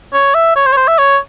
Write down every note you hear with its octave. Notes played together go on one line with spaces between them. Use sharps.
C#5
E5
C#5
C5
C#5
C5
E5
C#5